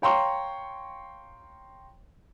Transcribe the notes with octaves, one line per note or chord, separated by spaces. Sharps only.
C#5 F5 G5 A#5 C6 C#6